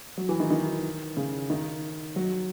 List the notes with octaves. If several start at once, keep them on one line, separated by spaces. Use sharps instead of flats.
F#3
E3
D#3
D#3
C#3
D#3
F#3